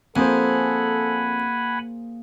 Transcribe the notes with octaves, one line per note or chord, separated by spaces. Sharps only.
F2 A#3 G#4 A4 C5 F#5 G#5 B5